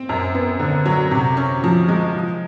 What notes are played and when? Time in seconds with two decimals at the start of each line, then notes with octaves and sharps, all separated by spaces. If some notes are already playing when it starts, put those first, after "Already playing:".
Already playing: C4
0.09 F#2
0.34 B3
0.60 D3
0.85 F#3
1.11 C3
1.37 C#4
1.64 F3
1.88 G#3
2.15 F3